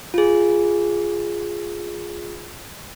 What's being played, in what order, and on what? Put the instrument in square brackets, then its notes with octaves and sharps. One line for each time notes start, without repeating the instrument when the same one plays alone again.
[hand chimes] F4 G#4